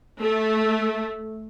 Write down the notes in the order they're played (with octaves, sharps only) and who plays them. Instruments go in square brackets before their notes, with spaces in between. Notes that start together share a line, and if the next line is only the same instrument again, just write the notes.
[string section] A3